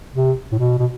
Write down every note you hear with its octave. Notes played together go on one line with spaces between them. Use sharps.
C3
A2
B2
B2